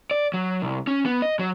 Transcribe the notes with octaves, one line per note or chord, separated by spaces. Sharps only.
D5
F#3
C2
C#4
B3
D#5
F#3